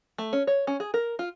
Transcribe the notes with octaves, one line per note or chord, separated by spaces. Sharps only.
A3
C#4
C#5
C#4
G#4
A#4
F4